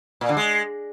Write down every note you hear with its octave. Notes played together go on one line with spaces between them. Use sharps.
A#2
D3
G#3